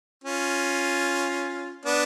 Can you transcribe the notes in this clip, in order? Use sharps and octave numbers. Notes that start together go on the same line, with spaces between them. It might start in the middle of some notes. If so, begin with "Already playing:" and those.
C#4 F4
B3 D4